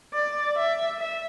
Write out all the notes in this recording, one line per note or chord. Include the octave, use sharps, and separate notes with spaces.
D5
E5
E5